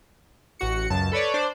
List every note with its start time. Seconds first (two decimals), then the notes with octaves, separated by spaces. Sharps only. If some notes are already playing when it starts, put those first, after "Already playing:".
0.59 A1 F#4 C#7
0.90 C#2 F#2 A5
1.12 A4 B4 C#5 D5
1.34 D4 C5 D5